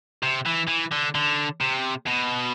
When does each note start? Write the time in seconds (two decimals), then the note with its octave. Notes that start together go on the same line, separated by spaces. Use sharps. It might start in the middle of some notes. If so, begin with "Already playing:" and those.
0.23 C3
0.46 E3
0.68 E3
0.92 D3
1.15 D3
1.61 C3
2.07 B2